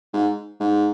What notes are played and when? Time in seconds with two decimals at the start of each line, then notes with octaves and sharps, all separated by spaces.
0.13 G#2
0.60 G#2